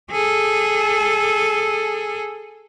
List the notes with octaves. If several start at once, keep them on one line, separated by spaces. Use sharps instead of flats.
G#4 A4